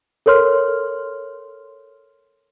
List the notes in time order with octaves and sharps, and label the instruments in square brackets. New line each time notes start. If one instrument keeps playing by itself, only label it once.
[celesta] A4 A#4 C#5 C6 F6